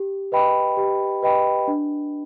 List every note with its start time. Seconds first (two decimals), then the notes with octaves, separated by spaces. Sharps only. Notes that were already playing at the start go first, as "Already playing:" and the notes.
Already playing: G4
0.32 B4 D#5 G5 B5
0.77 G4
1.22 B4 D#5 G5 B5
1.68 D4